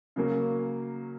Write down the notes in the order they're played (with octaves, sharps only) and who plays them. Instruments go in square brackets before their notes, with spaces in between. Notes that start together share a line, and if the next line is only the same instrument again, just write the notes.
[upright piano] C#3 F#3 A#3 C#4